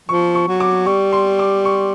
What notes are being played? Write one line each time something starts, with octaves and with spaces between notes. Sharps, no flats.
F3 C#6
C#6
F#3
D6
G3 C#6
C6
D6
C#6